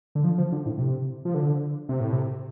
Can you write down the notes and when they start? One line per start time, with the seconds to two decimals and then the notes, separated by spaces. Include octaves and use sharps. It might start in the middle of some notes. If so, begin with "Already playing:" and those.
0.15 D3
0.24 F3
0.38 F3
0.52 D3
0.66 A2
0.78 C3
1.25 F3
1.34 D3
1.89 C3
2.00 A2
2.12 C3